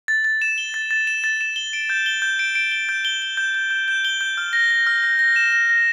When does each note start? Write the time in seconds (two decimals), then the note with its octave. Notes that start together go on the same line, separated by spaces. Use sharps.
0.08 A6
0.25 A6
0.42 E7
0.58 G7
0.74 A6
0.91 A6
1.07 E7
1.24 A6
1.41 E7
1.56 G7
1.73 D7
1.90 G6
2.06 G7
2.22 G6
2.39 D7
2.55 D7
2.72 G7
2.89 G6
3.05 G7
3.22 G7
3.37 G6
3.54 G6
3.71 G6
3.88 G6
4.05 G7
4.21 G6
4.37 F6
4.53 A#6
4.71 A#6
4.87 F6
5.04 A#6
5.19 A#6
5.36 E7
5.53 A#6
5.69 A#6